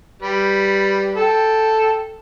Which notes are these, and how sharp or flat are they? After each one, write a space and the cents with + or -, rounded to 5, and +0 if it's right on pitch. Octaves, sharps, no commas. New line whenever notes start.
G3 +0 B4 +0
A4 +0 G5 +0